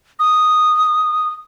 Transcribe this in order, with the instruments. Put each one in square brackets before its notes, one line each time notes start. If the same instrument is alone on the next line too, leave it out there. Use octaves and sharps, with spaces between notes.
[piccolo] D#6